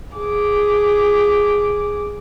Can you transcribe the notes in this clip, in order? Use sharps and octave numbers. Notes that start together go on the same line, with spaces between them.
G#4 D6